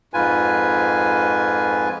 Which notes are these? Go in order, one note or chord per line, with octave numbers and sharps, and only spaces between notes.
F2 G#2 F4 B4 G#5